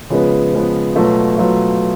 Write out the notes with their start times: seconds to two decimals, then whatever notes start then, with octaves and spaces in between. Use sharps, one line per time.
0.10 C#3 F3 G#3 B3
0.53 C#3 F3 G#3 B3
0.95 B2 F#3 A3 F4
1.38 B2 F#3 A3 F4